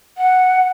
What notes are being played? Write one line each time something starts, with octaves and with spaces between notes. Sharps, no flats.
F#5